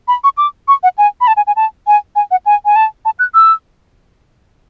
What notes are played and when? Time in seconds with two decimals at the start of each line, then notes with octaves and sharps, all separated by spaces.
0.08 B5
0.24 C#6
0.38 D6
0.68 C#6
0.83 F#5
0.98 G#5
1.21 B5
1.27 A5
1.37 G#5
1.47 G#5
1.56 A5
1.87 G#5
2.16 G#5
2.31 F#5
2.46 G#5
2.65 G#5
2.76 A5
3.05 A5
3.19 F#6
3.34 E6